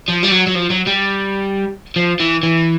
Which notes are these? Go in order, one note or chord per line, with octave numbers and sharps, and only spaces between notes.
F3
G3
F#3
F#3
F3
F#3
G3
F3
E3
E3